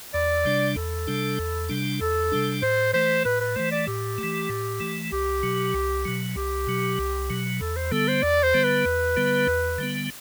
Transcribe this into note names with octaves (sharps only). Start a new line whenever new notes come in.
E2 D5
C3 G3 D4
E2 A4
C3 G3 D4
E2
C3 G3 D4
E2 A4
C3 G3 D4
A2 C5
E3 A3 C5
A2 B4
B4
E3 A3 C5
D5
A2 G4
A3
E3
A2
E3 A3
C2 G4
B2 F#3
C2
B2 F#3
C2 G4
B2 F#3
C2
B2 F#3
E2 A4
C5
D3 G3 B3 A4
C5
E2 D5
C5
D3 G3 B3
B4
E2
D3 G3 B3
E2
D3 G3 B3